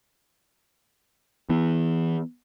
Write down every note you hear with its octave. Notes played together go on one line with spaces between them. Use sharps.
E3 B3